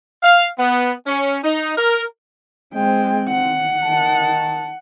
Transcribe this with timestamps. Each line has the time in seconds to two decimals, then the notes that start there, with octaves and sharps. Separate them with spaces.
0.23 F5
0.58 B3
1.06 C#4
1.44 D#4
1.77 A#4
2.74 G#3 C4 G5
3.28 F#5
3.83 D#3 A5